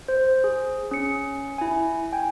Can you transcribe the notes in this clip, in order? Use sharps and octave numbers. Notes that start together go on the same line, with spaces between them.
C5
G#4
C#4 C#7
E4 G#5
G5 G#5